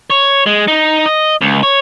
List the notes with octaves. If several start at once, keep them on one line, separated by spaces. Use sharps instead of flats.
C#5
G#3
D#4
D#5
C#2
C#5